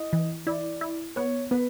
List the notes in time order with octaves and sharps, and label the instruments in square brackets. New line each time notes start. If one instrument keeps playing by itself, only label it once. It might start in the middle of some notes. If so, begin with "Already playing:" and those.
Already playing: [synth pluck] E4 [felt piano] D#5
[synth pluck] E3
[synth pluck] E4 [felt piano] D5
[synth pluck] E4
[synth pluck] B3 [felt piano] C#5
[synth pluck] B3 [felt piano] B4